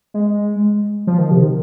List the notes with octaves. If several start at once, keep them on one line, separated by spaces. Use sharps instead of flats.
G#3
F3
D#3
C3
D#3